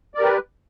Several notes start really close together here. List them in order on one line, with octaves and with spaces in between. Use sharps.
D5 A#4 G4 B4